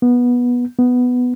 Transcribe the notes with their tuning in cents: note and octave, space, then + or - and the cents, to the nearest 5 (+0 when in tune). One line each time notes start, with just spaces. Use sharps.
B3 -15
B3 +5